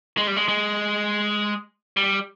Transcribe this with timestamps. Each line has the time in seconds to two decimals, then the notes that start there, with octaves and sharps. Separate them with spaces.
0.17 G#3
0.27 G3
0.36 G#3
0.48 G#3
1.97 G3